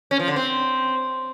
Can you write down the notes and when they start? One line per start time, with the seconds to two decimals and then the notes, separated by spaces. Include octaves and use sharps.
0.11 C#4
0.19 F3
0.28 D3
0.36 C4